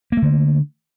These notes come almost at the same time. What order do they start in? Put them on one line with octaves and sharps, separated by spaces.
A#3 A3 D3